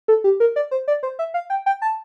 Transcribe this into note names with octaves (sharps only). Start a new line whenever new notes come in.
A4
G4
A#4
D5
C5
D5
C5
E5
F5
G5
G5
A5